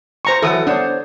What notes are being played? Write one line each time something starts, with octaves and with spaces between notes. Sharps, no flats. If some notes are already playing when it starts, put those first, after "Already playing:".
C5 A#5 C#6
E3 F#3 A4 D#6
B3 D4 C5 C#5